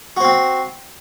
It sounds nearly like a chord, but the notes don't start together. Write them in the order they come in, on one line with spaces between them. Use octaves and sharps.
F#4 C5 C4